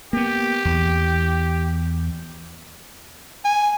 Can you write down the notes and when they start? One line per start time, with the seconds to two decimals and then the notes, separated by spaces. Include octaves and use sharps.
0.13 A#3 B3 G4
0.65 E2
3.45 G#5